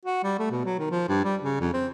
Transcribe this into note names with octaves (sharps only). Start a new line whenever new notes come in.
F#4
G3
A3
B2
F#3
D#3
F3
G2
G3
C#3
F2
C4